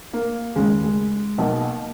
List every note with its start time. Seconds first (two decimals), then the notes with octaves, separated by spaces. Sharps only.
0.13 A#3
0.56 D#2 C#3 G#3
0.83 G#3
1.38 B1 B2 A#3